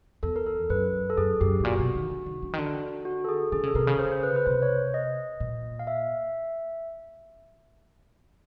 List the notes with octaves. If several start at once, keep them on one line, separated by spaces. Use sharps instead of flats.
E2 A4
A#4
A4
F#2 B4
A4
F#2 G#4
F#2 G4
A2
A#2 F#4
B2
D#3
D3
D#3
D3
D#3
D3
F#4
A4
G#4
D3 G#4
C#3 A4
C3 A#4
C#3
C5
C5
B4
B4
C3 C5
C#5
D#5
A#2
F5
E5